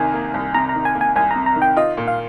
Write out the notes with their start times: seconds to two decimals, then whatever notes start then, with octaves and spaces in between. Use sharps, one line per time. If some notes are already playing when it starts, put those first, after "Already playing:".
Already playing: C2 C3 D#3 G#5
0.14 A#3
0.34 C2
0.54 C3 A#5
0.69 A#5
0.75 D#3
0.85 G#5
0.95 A#3
1.01 G#5
1.16 C2 G#5
1.31 A#5
1.36 C3
1.46 A#5
1.56 D#3
1.62 G5
1.77 F4 D#5
1.97 A#2
2.08 F5